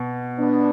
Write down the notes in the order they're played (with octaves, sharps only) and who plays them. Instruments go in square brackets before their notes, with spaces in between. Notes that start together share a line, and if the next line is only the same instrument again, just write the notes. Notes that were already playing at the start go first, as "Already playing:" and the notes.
Already playing: [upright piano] B2
[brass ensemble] B3 D4